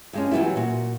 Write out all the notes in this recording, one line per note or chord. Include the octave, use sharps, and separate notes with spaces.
G2 G#3 C#4
E3 F#3 G3 B3 E4
A#2 F#4